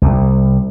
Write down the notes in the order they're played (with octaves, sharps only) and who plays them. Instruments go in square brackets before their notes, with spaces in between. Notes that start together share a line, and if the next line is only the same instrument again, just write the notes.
[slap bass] C2